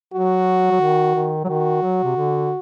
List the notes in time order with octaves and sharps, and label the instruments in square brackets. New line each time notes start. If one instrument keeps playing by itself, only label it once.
[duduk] F#3 [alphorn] F#4
[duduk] F#3
D#3
D#3
F#3
[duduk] D#3 [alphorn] F#4
[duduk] F#3
C3
D3